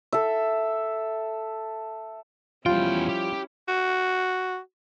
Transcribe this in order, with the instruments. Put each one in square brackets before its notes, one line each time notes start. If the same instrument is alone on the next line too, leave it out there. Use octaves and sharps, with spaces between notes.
[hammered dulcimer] A4 E5
[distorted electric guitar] E2 G5 [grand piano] F3 G3 [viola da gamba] C#4 E4 [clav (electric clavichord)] F4
[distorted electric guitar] G4
[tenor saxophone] F#4